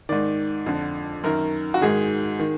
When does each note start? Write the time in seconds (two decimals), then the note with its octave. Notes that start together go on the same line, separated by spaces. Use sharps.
0.09 G#2 D#3 D5
0.66 F2 D3
1.24 F#2 D#3 A#4
1.74 F#4
1.81 G#2 D#3 G#4
2.39 D#3